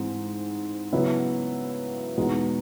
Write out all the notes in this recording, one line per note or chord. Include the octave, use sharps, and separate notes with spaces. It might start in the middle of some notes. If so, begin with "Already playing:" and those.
Already playing: G#2 E3 G#3 C4
C#3 F#3 B3 E4
E2 B2 G#3 B3 D#4